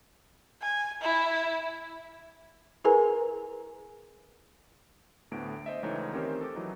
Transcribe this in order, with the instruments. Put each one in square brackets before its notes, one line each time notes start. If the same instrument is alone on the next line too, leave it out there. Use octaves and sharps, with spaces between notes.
[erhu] G#5
E4
[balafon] E4 G#4 A#4 B4 G#5 A#5
[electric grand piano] D2 A2 B3 D7
C5 D#5 E5
C#2 E3 A3 D#4 C#5
D#3 C4 C#4 G4 A#4 C5
A4 D6
E3 F#3 D#4